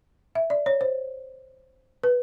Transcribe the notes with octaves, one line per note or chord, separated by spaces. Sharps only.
E5
D5
C#5
C5
B4